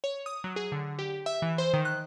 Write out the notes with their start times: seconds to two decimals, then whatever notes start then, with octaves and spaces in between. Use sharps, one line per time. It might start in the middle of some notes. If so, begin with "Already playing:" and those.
0.04 C#5
0.26 D#6
0.44 F#3
0.56 G#4
0.72 D3
0.99 G4
1.26 E5
1.42 E3
1.58 C5
1.74 D#3
1.85 F#6